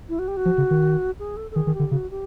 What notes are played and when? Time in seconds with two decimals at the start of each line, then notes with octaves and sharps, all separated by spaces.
0.09 E4
0.19 F#4
0.28 G4
0.37 F#4
0.45 F3
0.58 C#3
0.71 D#3
1.19 G#4
1.37 A4
1.51 A4
1.56 D#3 G#4
1.67 D#3
1.74 G4
1.80 D3
1.91 C#3 F#4
2.11 G4